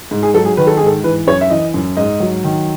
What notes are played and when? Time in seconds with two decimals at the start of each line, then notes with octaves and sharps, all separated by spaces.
0.11 G#2
0.23 G#4
0.34 F#3 A4
0.45 G#4
0.57 D#3 B4
0.67 A4
0.77 G#2 G#4
0.86 A4
1.04 E3 B4
1.27 F#2 C#5
1.41 E5
1.50 E3 D#5
1.74 F#2
1.97 G#2 D#5
2.20 F#3
2.44 D#3